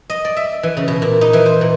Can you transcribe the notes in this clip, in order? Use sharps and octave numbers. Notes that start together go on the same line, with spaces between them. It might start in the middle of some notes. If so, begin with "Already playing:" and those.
D#5
D5
E5
E3
C#3
B2
A#2
D#4
E3
C5
A#2